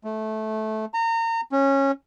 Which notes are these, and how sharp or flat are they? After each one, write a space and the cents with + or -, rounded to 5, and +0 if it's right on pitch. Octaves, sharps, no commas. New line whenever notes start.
A3 -15
A#5 -30
C#4 -15